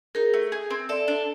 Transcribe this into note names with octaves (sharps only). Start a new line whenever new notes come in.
D#4 G#4 A#4
A3
G#4
C4
A4 D5 E5
D4